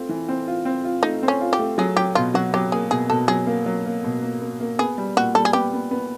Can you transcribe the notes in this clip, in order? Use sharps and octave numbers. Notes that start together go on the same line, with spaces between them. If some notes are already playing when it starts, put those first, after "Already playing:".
Already playing: A3 C4 F4
E3
C4
F4
C4
F4
A3 D#4
C4
C#4
F4
G4
A3
F#3 G#4
F#3 G4
B2 F4
F#3 F#4
F#3 G4
A#3 G#4
B2 G#4
B2 A4
F#3 G#4
A#3
F#3
A#3
B2
A#3
A#3
A#3
B3 G#4
G3
A#2 F#4
G3 A4
G#4
B3 G4
B3
B3